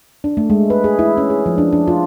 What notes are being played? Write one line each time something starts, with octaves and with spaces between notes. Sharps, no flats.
D4
A3
G#3
B4
G#4
E4
C#4
G#4
F3
D4
D4
F4